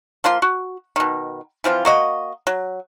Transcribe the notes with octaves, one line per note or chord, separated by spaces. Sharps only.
F3 A#3 F4 C6
F#4
B2 D#3
E3 F3 C4 F4
A#3 F#4 D#5
F#3